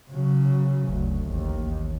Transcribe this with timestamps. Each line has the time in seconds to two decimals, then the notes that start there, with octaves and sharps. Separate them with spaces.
0.11 C#3 F#3
0.88 F#1 D2
1.30 A1 D#2